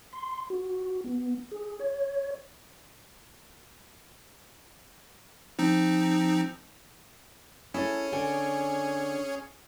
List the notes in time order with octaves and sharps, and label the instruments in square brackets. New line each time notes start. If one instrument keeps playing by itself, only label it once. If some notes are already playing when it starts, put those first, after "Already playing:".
[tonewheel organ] C6
F#4
B3
G#4
C#5
[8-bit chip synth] F3 C4 D#4
[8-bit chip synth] C#4 G#4 C#5 [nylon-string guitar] E4 A4
[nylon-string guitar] D3 A4 G#5